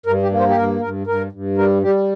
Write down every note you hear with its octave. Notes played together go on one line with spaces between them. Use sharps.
G2 A#4
G4
A#3
C5
G4
G2 A#4
G2 A#4
G2 A#4
G2
G3 A#4
G3 G4